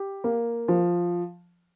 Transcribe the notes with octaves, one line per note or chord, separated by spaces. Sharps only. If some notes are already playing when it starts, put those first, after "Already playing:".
Already playing: G4
A#3
F3